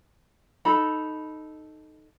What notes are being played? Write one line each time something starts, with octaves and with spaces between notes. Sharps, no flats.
D#4 A4 B5